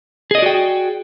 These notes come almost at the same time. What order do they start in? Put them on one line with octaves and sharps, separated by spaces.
G#4 D#5 D5 F#4 G5